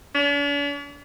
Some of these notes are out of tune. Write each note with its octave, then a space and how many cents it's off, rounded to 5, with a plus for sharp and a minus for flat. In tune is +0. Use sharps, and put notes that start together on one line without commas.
D4 -45